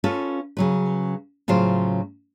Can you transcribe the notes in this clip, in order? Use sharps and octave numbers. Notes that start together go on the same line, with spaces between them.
C#4 F4 A4 B4
C#3 F#3 B4
A2 C#3 F#3 F4 C5